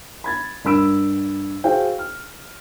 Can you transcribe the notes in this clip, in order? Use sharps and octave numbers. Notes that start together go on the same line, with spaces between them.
B5 G#6 A6
G2 A#4 B5 E6 D7
F#4 G#4 C5 F5 G5
F6